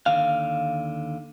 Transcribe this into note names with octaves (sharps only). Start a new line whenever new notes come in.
D#2 D3 F5